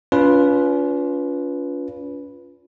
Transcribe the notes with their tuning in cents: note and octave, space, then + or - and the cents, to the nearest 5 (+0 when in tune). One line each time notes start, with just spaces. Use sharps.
C#4 +40 F4 +0 B4 -5